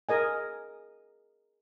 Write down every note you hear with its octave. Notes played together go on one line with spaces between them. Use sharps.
G#4 A#4 D#5 G#5